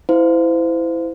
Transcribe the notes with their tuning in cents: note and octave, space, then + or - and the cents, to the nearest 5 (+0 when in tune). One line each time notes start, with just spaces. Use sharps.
E4 +0 C5 -30 F5 +10